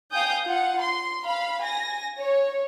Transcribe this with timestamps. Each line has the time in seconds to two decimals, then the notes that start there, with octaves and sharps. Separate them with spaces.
0.12 F5 G5 G#5 D#6 G6
0.46 F4 F#5
0.79 C6
1.24 F5 B5
1.64 G#5 A#6
2.20 C#5